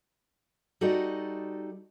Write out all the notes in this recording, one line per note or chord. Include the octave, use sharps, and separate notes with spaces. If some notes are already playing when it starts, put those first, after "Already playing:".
G3 D#4 F#4 A4 D5 D#5